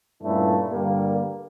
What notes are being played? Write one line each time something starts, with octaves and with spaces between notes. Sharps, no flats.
G2 A#2 A3 C#4 E4
G2 D3 G3 A#3